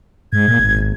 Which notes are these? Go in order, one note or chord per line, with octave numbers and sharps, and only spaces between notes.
G#2 G#6
A#2
G#1